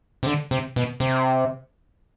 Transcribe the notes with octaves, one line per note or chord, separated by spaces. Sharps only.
C3
D3
C3
B2
C3